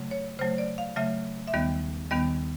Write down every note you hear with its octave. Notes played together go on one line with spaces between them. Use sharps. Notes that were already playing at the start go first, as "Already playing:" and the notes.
Already playing: C#3 F#3 A3
C#5
C#3 F#3 A3 C5
D5
F5
C#3 F#3 A3 E5
E5
D#2 D#3 G3 B3 D#5
D#2 D#3 G3 B3 D#5